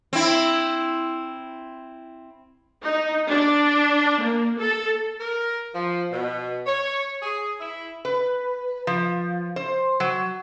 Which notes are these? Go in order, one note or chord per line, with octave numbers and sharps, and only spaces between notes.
C4 E4
D#4
D4
A#3
A4
A#4
F3
B2
C#5
G#4
E4
B4
F3
C5
F#3